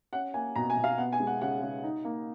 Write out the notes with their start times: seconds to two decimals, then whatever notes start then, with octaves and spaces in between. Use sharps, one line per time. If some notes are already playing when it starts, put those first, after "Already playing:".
0.13 C#4 F#5
0.34 A#3 G#5
0.55 B2 A#5
0.70 G#5
0.77 B2
0.84 F5
0.98 B3 F#5
1.13 G#5
1.20 G#3
1.27 F#5
1.41 C#3 F#5
1.62 C#3
1.83 D#4
2.05 A#3